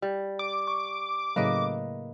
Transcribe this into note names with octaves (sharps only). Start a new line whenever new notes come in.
G3
D6
C#6
A2 C#3 F#3 A#3 B4 D#5